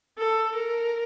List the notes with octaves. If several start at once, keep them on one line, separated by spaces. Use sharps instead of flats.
A4
A#4